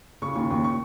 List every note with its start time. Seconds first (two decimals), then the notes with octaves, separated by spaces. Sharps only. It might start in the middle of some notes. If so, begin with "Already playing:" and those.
0.22 C#3 C#6
0.35 D#2 C#6
0.50 D#2 C#6
0.64 C#6